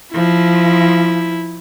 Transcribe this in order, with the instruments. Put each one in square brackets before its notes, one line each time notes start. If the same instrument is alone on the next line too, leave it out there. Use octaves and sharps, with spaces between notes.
[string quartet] F3 [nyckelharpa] E4